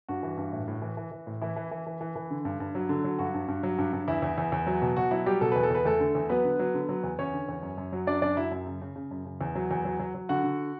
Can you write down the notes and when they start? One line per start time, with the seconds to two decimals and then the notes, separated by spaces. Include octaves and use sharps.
0.09 G2 F#4
0.23 E3
0.37 G2
0.53 A2
0.68 A2
0.82 E3
0.97 E3
1.11 E3
1.27 A2
1.41 E3 E4
1.56 E3
1.71 E3
1.86 E3
2.01 E3
2.16 E3
2.31 D3
2.45 G2
2.60 G2
2.75 F#3
2.89 D3
3.04 F#3
3.19 G2 F#4
3.34 G2
3.48 G2
3.63 F#3
3.78 G2
3.93 G2
4.08 E2 E4
4.22 E2
4.38 E2
4.52 E2
4.67 F#3
4.82 B2
4.96 B2 F#4
5.11 F#3 E4
5.26 F#3 G3 G4
5.41 B2 A4
5.52 E2 B4
5.63 A4
5.70 E2 B4
5.85 E2 A3 A4
6.00 D3
6.15 E2
6.29 F#3 B3 B4
6.44 D3
6.59 F#3
6.74 D3
6.89 F#3
7.04 E2
7.19 E2 C#4 C#5
7.33 D3
7.49 E2
7.63 F#2
7.78 F#2
7.93 F#3
8.07 F#2 D4 D5
8.22 F#2 D4 D5
8.37 F#3 E4 E5
8.52 F#2
8.67 C#3
8.82 C#3
8.96 C#3
9.11 F#2
9.26 C#3
9.41 E2
9.55 F#3
9.71 E2
9.85 F#3
10.00 F#3
10.15 F#3
10.29 D3 F#4 F#5
10.44 D3